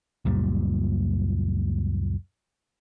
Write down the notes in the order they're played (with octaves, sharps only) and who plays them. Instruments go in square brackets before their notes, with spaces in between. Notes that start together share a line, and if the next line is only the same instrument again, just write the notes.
[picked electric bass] C#2 F#2 A#2 G3